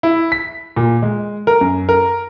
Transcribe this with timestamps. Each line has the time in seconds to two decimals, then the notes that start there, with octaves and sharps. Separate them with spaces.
0.03 E4
0.32 B6
0.76 A#2
1.02 G#3
1.47 A#4
1.61 F#2
1.89 A#4